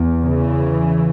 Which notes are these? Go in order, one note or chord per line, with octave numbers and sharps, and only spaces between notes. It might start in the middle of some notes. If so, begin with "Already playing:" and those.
Already playing: E2
C#3 E3